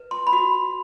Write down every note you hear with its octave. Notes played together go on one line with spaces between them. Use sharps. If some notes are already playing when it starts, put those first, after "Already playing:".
Already playing: B4
C6
B5
F#4 C6